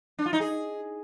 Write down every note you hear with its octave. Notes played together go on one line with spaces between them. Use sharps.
D4
F4
D#4
G#4